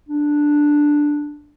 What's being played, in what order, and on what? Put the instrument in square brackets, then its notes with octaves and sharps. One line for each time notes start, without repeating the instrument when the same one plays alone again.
[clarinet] D4